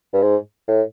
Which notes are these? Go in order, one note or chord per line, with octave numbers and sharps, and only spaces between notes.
G2
G#2
A2